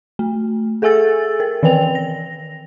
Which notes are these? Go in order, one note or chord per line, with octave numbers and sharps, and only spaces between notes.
A3
G#4 A4 E5 G#5 E6 A6
A#4
D#3 E3 B4 G5 F7
A#6